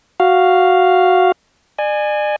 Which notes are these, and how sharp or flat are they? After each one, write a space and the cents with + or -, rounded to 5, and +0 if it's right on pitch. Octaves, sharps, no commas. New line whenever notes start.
F#4 +0 F5 +0
D5 +40 G#5 +0